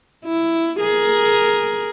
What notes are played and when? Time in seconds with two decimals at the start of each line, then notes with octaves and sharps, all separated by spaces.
0.25 E4
0.80 G#4 A#4